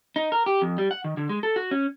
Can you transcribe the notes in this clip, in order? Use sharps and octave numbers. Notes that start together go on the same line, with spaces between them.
D#4
A#4
G4
F2
G3
F#5
D#3
D3
G#3
A4
F#4
C#4